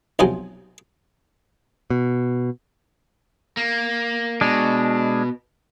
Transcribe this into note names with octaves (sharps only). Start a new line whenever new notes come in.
B1 C3 F3 F#3 G#5
B2
A#3
B2 G#3 D4